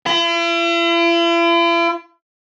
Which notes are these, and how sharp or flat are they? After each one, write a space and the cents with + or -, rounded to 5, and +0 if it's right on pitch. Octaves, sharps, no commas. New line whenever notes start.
E4 +45